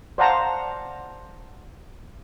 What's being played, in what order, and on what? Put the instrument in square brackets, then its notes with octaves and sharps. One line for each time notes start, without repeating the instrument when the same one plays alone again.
[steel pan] C5 D5 F5 F#5 A5 A#5